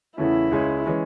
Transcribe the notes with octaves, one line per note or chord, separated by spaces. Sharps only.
E2 C#3 E3 A3 C#4 E4
C#2 C#3 G#3 C#4
E3 G#3 C#4